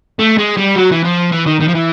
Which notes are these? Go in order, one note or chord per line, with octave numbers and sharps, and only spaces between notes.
A3
G#3
G3
F#3
E3
F3
E3
D#3
D#3
F3
E3